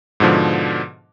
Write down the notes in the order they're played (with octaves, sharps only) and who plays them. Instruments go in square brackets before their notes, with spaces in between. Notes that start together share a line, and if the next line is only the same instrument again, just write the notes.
[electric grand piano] G#2 B2 D3 F3